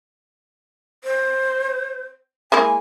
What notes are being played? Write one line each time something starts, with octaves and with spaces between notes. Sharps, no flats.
C5
G#3 A#3 E4 G#5